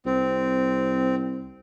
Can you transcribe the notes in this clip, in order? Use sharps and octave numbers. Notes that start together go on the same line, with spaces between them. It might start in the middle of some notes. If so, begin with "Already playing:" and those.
C2 C4